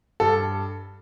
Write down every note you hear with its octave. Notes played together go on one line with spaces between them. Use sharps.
G2 A4